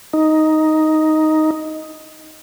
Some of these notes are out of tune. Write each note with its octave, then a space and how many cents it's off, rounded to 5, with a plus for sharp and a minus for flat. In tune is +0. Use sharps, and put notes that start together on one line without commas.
D#4 +5